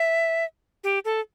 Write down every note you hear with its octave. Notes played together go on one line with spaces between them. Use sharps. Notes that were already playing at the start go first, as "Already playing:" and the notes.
Already playing: E5
G4
A4